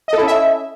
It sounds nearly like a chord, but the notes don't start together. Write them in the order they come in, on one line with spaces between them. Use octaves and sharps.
D#5 A4 E4 C#4 E5